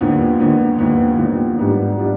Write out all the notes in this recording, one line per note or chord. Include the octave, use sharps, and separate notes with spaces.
D#2 D3 F3 B3
D#2 D3 F3 B3
D#2 D3 F3 B3
D#2 D3 F3 B3
G#2 G3 B3 D4 F4
G3 B3 D4 F4